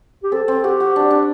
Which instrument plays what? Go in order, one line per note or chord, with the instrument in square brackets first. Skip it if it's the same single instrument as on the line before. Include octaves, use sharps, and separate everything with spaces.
[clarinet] G4
[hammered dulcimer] C4 [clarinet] A4
[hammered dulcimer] C4
[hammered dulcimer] F#4 [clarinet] G4
[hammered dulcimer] F#4
D4
D4